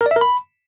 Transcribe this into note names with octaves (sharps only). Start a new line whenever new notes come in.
A#4
D5
E5
A#4
B5